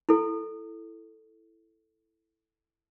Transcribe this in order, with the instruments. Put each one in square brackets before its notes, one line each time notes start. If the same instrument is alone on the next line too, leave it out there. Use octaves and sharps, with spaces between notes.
[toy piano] E4 A4